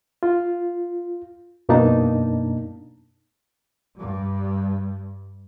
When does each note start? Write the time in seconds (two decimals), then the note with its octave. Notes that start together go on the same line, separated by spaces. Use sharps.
0.23 F4
1.69 F#2 B2 A#3 D4 D#4 A5
3.97 G2 G3